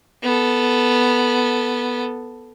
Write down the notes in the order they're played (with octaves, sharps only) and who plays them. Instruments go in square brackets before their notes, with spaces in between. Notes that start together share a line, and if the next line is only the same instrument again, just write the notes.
[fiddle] B3 A4